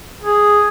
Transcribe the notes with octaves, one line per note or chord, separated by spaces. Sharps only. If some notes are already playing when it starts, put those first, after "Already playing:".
G#4